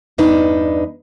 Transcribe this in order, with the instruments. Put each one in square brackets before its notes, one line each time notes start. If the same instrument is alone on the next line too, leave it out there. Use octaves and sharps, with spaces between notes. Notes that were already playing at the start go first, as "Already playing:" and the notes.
[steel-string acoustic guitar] E2 G2 D4 D#4 B4